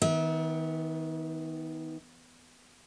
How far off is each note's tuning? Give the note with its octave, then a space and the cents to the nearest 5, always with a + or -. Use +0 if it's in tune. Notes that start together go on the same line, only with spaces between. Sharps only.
D#3 +35 B3 +0 E5 -35